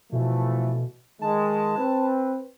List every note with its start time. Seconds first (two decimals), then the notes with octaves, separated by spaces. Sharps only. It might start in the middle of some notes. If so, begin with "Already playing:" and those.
0.12 B2 E3 F3 A3
1.22 D#3 G#3 A5
1.78 C4 B4